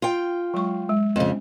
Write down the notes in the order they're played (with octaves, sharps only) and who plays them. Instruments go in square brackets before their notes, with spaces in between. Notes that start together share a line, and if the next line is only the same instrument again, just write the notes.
[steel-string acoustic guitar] F4 G5
[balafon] F#3 G#3 C#6
G#3
[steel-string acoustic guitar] F2 C#3 [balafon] C4